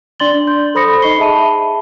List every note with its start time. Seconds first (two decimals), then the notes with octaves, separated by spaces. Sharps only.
0.20 D4 D5 C6 A6 F#7 G7
0.47 C6 G6
0.75 A4 C5 B5 D#6 A#6 C#7
1.02 D#4 D#5 B5 C#6 C7 G7
1.19 G#4 E5 A5 B5 D#7